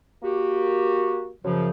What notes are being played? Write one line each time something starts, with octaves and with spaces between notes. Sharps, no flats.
A#3 F#4 G4
F#2 C#3 F3